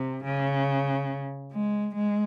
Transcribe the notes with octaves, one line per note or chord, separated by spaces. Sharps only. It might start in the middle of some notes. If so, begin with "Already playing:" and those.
Already playing: C3
C#3
G#3
G#3